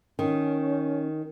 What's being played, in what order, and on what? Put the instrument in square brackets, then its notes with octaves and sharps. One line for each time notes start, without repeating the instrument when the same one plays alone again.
[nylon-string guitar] D#3 [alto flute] C#4